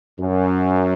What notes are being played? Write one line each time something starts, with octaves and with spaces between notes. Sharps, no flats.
F#2